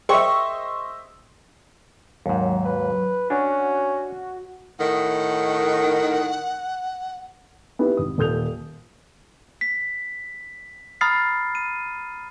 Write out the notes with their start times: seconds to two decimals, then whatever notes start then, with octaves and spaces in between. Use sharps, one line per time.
0.09 G#4 A#4 C5 D#5 E5 G5 C#6
2.26 D#2 G#2 F#3
2.65 B4
3.30 C#4 D4 F#4
4.79 A2 D#3 F#5
7.79 B3 D#4 E4 G4
7.97 G#1 D#6
8.18 D#1 A4 D#6 G6 F7
9.61 B6
11.01 A#5 B5 D#6 F6 A6 C7
11.55 D#7